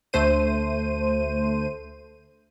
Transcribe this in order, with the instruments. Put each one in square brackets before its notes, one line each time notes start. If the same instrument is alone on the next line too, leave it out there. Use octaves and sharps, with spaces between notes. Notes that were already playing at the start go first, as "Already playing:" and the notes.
[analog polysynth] D2 A3 C5 D#7